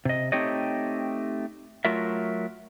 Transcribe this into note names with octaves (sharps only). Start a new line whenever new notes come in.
C3 D#5
A3 C4 D#4 G4 C#5 D#5
F#3 A3 F4 A#4 E5